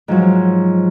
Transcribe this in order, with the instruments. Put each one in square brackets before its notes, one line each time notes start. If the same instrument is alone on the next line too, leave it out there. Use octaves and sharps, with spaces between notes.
[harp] G#2 F3 F#3